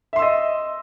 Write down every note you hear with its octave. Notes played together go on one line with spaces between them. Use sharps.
D#5 E5 C6 E6